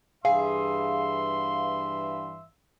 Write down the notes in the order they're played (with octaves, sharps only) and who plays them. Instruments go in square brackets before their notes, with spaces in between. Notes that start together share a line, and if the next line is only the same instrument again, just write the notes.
[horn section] G2 E3 E5 [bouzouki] G#4 [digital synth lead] F5 [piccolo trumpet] C6